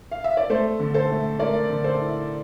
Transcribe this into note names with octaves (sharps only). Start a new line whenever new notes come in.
F5
E5
D5
A3 A4 C5
D3
A4 C5
A3
A3 A#4 D5
D3
A4 C5
E4